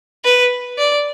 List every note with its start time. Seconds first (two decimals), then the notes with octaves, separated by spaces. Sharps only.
0.25 B4
0.78 D5